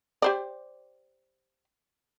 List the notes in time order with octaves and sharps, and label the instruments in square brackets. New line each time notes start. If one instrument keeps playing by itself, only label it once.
[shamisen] G4 C5 D5